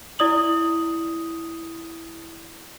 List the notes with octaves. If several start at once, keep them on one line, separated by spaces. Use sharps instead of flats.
E4 D5 D#6 F#7